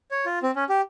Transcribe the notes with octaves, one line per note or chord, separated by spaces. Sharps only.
C#5
F4
C4
C#4
G4